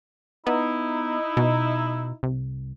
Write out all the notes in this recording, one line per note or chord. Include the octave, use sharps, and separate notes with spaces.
B3 D#4 E4
B2
C2